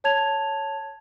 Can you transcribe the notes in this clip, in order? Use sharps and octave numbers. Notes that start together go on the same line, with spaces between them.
C#5 A5 G#6 F7